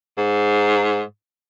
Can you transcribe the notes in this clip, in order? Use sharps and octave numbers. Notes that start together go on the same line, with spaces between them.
G#2